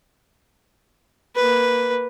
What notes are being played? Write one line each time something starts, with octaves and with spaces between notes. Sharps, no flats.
A#3 B4